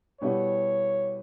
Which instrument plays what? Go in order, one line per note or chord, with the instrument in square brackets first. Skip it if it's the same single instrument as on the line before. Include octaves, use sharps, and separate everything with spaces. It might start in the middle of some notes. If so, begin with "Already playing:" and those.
[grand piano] B2 G3 B3 E4 G4 [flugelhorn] C#5